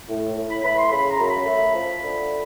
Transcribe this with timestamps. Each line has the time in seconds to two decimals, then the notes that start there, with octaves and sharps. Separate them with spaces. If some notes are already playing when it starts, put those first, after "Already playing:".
0.09 A2
0.37 A2
0.50 B5
0.64 A3 B5
0.77 C6
0.91 C#3 B5
1.10 A#5
1.19 F#2
1.28 B5
1.46 A3
1.74 F3
2.01 D3